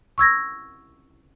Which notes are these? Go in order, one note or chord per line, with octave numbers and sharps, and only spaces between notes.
C#6 E6 G#6 A#6